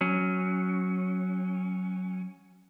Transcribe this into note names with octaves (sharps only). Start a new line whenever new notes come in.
F#3 C#4